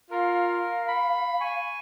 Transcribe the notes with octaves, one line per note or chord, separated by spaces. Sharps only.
F4 A#4 F5
B5
G#5 C#6